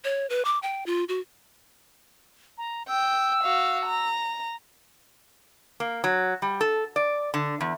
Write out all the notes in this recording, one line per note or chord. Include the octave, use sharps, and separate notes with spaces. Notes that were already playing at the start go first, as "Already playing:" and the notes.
C#5
B4
D6
G5
F4
F#4
A#5
G5 E6
F#4 F5
A#5
A#3
F#3
G3
A4
D5
D3
E2